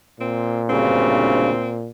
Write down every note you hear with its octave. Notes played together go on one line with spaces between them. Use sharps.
A#2 C4
D2 G2 C#3 C4